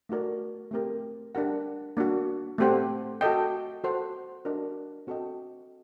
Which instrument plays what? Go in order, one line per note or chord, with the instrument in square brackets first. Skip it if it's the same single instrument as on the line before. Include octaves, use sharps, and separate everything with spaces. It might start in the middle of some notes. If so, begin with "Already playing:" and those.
[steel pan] A3 D#4 F#4 A#4 D5
A3 C4 G4 A#4
D4 G4 A#4 F#5
A#3 D4 F#4
A3 C4 G4 C5 F#5
F#4 A4 D#5 G5
F#4 A4 C5 F#5
D4 F#4 A#4 D#5
C4 F#4 A4 D#5 G5